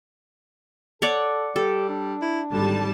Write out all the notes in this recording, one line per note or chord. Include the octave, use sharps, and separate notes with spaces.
A4 C#5 D5 F#5
G3 G4 A4
D4
E4
G#1 D3 G3 A5